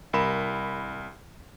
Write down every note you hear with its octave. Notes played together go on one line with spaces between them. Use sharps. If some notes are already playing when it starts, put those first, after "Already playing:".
C2 A#4 B5 E7